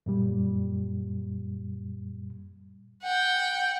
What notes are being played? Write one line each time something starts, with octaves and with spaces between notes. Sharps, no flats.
F#2 A#2 G3
F#5 G5